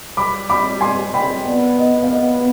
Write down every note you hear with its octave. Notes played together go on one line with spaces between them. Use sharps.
G3 B5 D6
B5 D6
G#5 C6
G5 B5
B3 D5
D#5
F5
B3 D#5